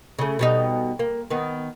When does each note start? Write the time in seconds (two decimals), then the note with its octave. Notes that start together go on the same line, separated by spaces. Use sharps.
0.19 C#3 A3
0.39 B2 G3 D#4
0.99 A#3
1.30 D#3 B3